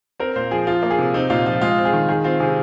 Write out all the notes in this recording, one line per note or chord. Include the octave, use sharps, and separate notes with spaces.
C4 A#4
A#2 C5
F3 G#4
F3 F4
A#3
G#4
C3
C4 D#4
A#2 F4
F3 F4
G#3 F4
C4
G#4
D#3
D#3 G#4
C4 F4
C3 G#4